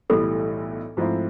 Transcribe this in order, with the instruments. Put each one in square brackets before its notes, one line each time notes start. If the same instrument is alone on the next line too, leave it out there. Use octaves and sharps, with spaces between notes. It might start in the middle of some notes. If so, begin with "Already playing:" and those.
[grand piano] B1 A2 E3 G3 [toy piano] A4
[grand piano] G#2 F3 A3 C4 E4